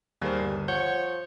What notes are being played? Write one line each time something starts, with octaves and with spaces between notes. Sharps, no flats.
D#2 G3 G#4 A#4 C5
G1
F3 C#5 F#5 G6